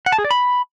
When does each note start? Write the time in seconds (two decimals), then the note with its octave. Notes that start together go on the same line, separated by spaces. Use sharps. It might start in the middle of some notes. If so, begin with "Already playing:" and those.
0.06 F#5
0.12 A5
0.18 G#4
0.24 D5
0.31 B5